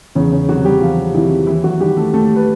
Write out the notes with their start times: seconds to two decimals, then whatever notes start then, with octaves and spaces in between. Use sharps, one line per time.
0.15 E2 C#3 C#4
0.32 C#3 C#4
0.48 C3 D#3 F#3 F#4
0.65 G3 G4
0.81 E2 F3 F4
1.14 C3 D#3 E3 E4
1.47 D#2 E3 E4
1.64 F#3 F#4
1.80 D#3 F#3 G3 G4
1.97 A3 A4
2.13 D#2 A3 A4
2.36 B4